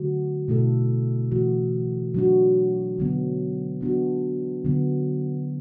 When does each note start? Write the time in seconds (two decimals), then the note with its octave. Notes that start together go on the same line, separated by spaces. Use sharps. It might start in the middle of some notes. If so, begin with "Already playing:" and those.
Already playing: D3 F#3 A3 F#4
0.48 B2 A3 E4 A4
1.31 E3 A3 F#4
2.14 F#3 D4 F#4
2.98 D3 F#3 B3
3.81 F#3 B3 D4 F#4
4.65 D3 F#3 B3